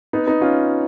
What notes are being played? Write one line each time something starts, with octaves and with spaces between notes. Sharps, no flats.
B3 D#4
B3 D#4
C#4 F4